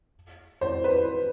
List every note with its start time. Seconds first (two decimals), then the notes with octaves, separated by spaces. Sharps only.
0.61 C5
0.84 B4